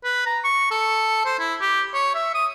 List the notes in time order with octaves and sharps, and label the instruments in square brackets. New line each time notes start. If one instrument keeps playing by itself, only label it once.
[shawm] B4
A#5
C#6
A4
C5
E4
G4
C#5
E5
D#6